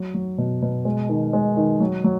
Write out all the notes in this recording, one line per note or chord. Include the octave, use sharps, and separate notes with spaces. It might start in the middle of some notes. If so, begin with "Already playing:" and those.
Already playing: F#3
F#3
B2
B2
G#3
D#3
G#3
D#3
F#3
F#3